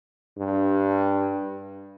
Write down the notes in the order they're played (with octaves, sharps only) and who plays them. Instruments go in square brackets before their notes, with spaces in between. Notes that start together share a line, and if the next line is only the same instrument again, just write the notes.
[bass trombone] G2